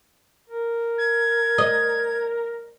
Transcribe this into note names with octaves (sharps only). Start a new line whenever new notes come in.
A#4
G#6
D#5